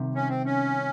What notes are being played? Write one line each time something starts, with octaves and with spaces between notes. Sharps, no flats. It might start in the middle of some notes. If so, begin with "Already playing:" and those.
Already playing: C2 C3 D#3
C#4
C4
C#4